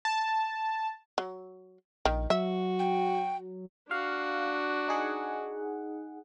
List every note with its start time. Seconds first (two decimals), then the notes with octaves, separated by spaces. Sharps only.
0.05 A5
1.18 F#3
2.05 A#1 D#3
2.30 F#3 F#4 E5
2.79 G5
3.91 D4 F#4 F5
4.88 D#4 G#4 F#5